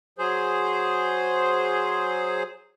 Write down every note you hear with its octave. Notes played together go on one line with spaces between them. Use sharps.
F#3 G#4 C5